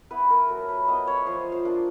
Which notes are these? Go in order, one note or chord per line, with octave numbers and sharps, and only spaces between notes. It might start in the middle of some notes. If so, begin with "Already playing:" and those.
B3 E4 B4
A#4
F#3 A4
B4
B3 E4 D#5
C#5
F3 C5
C5
A#3 D4 F4